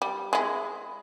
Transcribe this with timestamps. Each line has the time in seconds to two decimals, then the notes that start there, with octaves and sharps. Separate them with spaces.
0.02 G3
0.33 G#3 E4